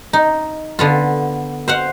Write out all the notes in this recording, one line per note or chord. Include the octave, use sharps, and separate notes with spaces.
D#4
D3 B3 F4
C5 F5 F#5